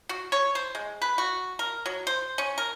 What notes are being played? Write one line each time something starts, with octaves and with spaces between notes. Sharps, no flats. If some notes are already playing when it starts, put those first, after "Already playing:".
F#4
C#5
C5
G#3
B4
F#4
A#4
F#3
C5
C#4
A#4